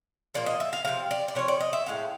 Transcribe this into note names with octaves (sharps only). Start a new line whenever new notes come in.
A#2 F3 A#3 D5
D#5
E5
F5
C3 F3 G#3 C#4 F5
D5
D5
C3 F3 C#4 C#5
D5
D#5
E5
A2 F3 G#3 C#4 F5